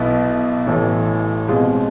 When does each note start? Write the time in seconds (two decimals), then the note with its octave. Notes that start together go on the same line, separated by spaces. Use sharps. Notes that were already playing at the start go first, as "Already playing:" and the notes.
Already playing: B1 B2 B3 E4
0.66 A1 A2 E3 A3
1.48 B2 G#3 C4 F4